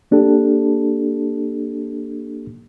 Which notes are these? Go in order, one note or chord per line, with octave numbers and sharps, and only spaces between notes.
A#3 D4 G4 A4